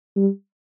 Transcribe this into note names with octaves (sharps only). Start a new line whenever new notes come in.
G3